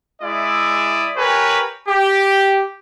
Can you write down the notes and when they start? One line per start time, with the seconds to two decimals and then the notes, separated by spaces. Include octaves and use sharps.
0.22 G#3 E4 D5 E5 D#6
1.17 G4 A#4 B4 C#5 G#5
1.88 G4